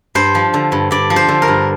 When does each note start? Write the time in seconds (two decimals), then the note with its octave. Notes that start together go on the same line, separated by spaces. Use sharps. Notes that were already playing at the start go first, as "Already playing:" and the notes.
0.15 G2 C5
0.35 F3
0.54 D3
0.72 G2
0.91 G2 D5
1.10 F3
1.16 C5
1.28 D3
1.42 A#4
1.48 G2